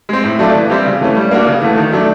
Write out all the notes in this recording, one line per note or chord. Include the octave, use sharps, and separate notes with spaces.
G#3 C4
A2
F#3 A3 D4 F4
E3
G3 C4 E4 G4
C#3
E3 A3 C#4
G3
A#3 D4 F#4
C#3
E3 A3
D#3
F#3 A3 D4